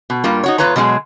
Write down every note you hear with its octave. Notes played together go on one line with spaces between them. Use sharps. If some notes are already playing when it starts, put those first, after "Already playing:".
B2
G2 G3 A#3 F4
D#4 F#4 C#5
E2 C3 F4 B4 C#5 A#5
B2 F#3 G#3 G#4